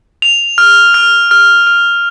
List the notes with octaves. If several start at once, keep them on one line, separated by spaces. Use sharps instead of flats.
F7
F6
F6
F6
F6